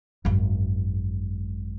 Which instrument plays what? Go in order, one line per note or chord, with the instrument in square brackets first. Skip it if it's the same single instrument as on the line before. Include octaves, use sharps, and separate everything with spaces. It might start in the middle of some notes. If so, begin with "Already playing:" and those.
[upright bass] G#1 F#2